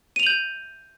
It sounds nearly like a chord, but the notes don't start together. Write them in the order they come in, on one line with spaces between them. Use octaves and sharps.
D#7 F7 F#7 G6